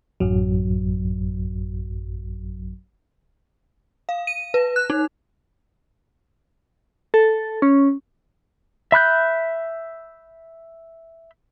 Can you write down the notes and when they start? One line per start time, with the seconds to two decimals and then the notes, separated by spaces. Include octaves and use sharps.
0.20 A1 F#2 F#3
4.09 F5
4.27 D#7
4.54 B4
4.76 F#6
4.90 D#4
7.14 A4
7.62 C#4
8.92 E5 B5 F#6 G6